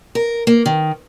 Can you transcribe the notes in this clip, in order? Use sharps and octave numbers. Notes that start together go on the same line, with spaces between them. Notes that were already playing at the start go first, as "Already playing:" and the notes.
A#4
A#3
D#3